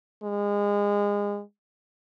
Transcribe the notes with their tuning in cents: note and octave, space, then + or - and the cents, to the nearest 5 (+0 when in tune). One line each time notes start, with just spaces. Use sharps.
G#3 -30